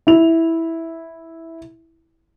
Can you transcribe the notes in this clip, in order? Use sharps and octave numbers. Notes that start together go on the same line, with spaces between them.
E4 F7